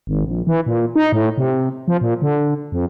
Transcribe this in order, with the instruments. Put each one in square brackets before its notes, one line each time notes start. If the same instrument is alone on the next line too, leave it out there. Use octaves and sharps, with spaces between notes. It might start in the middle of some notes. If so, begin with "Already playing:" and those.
[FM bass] G#1
A#1
E3
A#2
D#4
A2
C3
F3
A#2
D3
F2